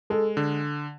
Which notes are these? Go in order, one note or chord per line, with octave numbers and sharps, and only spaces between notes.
G#3 A4
D3